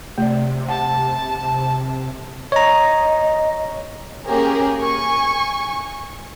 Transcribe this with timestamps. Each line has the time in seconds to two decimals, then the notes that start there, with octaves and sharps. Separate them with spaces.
0.18 C3 A3 D5
0.69 F#5 A5
2.52 C#5 D#5 A#5
4.27 A#3 C#4 G4 G#4 A#4
4.79 G#5 C#6